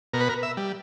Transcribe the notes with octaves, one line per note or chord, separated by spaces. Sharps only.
B2 A#4
B4
A#4
E5
G3